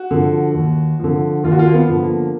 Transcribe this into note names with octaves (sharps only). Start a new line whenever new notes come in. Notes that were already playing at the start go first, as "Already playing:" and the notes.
Already playing: F#4
D3 F3
D#2
D3 F3
D#2 F4
F#4
F4
A#3
B3
D3 F3
A#3